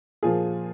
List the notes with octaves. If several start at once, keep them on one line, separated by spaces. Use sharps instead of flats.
A#2 F3 F4 G#4